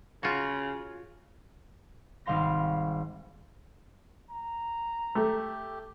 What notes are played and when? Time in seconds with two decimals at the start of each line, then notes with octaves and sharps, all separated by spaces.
0.23 C#3 F4 F#4
2.26 G#1 G3 F5 C6 A#6
4.31 A#5
5.15 A3 G4